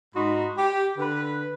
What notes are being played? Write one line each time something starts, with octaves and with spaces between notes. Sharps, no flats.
G#2 D#4 F#4 B5 C6
G4
D3 B4